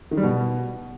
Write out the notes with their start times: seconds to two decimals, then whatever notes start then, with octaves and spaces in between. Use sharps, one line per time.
0.11 D#3
0.17 G3
0.23 B2